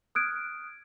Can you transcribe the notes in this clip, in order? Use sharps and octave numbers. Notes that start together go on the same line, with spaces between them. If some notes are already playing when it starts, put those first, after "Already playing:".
D#6 F6 F#6 G#6 D7